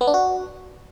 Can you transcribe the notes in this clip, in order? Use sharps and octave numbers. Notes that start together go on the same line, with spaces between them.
B3
D4
F#4